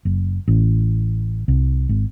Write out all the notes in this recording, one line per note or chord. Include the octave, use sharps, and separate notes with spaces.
F#1
A1
C2
G#1